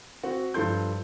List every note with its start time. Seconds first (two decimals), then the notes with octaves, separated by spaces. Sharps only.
0.23 C4 F#4
0.54 G2 F3 A4 C6 G6